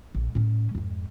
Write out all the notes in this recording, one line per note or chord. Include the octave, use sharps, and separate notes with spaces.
A#1
A2 C#4
F2 G#2